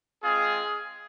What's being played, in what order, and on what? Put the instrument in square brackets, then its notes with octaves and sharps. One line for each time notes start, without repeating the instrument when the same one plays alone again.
[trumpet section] G#3 C4 F4 G#4